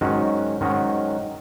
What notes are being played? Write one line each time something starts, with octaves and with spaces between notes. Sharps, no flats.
G#2 D#3 F#3 C#4 F#4
G#2 D#3 F#3 C#4 F#4